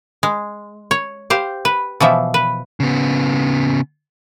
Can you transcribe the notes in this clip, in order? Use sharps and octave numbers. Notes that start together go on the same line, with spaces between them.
G#3
C#5
G4 C5 F5
B4
B2 E3 F3 E5
B4
C#3 B3